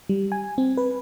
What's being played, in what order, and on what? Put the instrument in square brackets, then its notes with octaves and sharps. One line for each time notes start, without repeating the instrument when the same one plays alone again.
[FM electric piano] G3
G#5
C4
B4